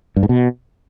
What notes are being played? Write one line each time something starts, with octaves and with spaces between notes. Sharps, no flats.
G2
G#2
B2